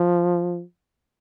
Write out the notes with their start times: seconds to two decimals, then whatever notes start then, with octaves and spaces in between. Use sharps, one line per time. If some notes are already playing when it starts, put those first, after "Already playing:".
Already playing: F3